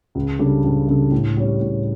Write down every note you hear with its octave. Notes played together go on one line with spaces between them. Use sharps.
C#2
C#3 G3 D4 A4
C#2
C#3 G3 D4 A4
A2
G3 C#4
A2